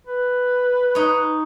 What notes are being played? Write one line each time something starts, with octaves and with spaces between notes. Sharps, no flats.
B4
D#4 C#5